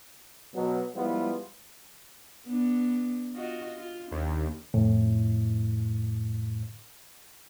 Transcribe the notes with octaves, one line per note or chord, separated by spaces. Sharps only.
B2 F#3
F3 G3 G#3 B3 E4 F4
B3 D4
F4 F#4 D#5
F4
D#2 D4
F2 A2